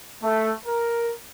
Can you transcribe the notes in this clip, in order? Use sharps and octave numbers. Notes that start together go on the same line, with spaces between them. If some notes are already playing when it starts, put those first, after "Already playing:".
A3
A#4